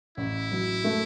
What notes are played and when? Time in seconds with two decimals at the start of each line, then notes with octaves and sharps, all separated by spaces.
0.17 A1 E4
0.52 F#3
0.84 A3